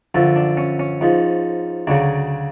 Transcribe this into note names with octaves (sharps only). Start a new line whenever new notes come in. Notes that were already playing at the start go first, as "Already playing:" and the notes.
F#2 D3 F3
D4
C#4
C#4
G#2 F3
D2 C#3 F#3 D4